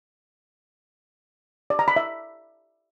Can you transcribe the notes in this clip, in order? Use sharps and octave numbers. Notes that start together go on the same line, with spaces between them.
D5
A#5
B5
E5